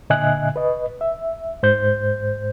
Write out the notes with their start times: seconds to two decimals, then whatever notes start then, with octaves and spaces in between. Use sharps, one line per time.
0.10 A#2 D3 D#5 E5 G#5 F#6
0.56 B4 D#5
1.01 E5
1.63 G#2 C5 G6